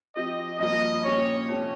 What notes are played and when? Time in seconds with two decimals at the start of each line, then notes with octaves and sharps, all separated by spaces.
0.16 F3 C4 G4 D#5
0.60 G2 F3 A#3 D#5
1.04 A#2 G3 C#4 G4 C#5
1.48 F2 C3 G3 C#4